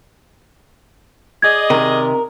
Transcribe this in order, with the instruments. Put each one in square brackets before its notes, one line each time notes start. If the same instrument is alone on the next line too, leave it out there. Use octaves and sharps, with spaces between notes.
[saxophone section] G#4 D5 D#5 [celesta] G#6
[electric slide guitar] C3 D#3 [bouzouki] A#4